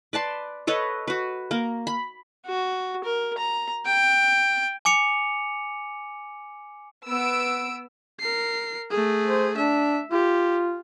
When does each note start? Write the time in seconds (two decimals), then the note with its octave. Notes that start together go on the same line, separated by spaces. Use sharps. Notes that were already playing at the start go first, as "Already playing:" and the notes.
0.13 B4 D5 A5 C6
0.67 A4 B4 C#5 D#5
1.08 F#4 B4
1.51 A#3 A#4
1.87 B5
2.46 F#4
3.04 A#4
3.38 A#5
3.86 G5
4.85 G#5 D6 C#7 F7
7.07 B3 E6 D7
8.20 A#4 C7
8.91 A3 G#4
9.27 C5
9.57 D4 E5
10.12 F4 G4